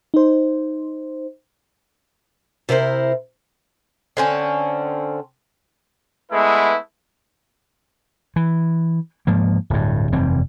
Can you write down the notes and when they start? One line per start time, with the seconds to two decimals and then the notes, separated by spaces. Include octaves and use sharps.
0.14 D#4 C5
2.69 C3 E4 A#4 C5
4.17 D3 C4 C#4
6.32 G#3 A3 B3 E4 B4
8.36 E3
9.27 G#2 F3 A#3
9.70 D1 G2
10.12 F1 G2 E3 C4